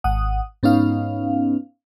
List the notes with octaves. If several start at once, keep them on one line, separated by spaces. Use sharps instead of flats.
G#1 F#5 D#6
G#2 B3 C#4 D#4 F5